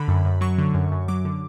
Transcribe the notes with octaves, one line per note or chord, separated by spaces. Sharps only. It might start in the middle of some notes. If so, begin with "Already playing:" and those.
Already playing: D3 B5
F#2
F#2
F#3 C#6
D3
F#2
F#2
F#3 D6
D3